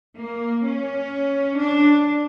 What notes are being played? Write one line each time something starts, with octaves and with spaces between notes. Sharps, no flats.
A#3
C#4
D4